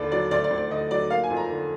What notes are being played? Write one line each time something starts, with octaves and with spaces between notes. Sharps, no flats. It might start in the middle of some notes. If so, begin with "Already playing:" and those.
Already playing: D#2 D3 B4 D5
F#3 D5
D2 D5
D5
D2
D5
D3 D#5
F#3 D5
A#3 F5
G#5
F2
A#5
D3